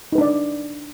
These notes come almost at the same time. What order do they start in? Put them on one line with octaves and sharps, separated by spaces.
D#4 B4 D4 D5